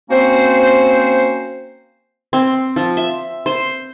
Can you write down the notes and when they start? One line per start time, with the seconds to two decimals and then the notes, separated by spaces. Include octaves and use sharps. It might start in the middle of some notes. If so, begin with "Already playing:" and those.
0.10 A#3 C4 C#4 F#4 C5
2.33 C4
2.76 F3
2.97 E5
3.46 C5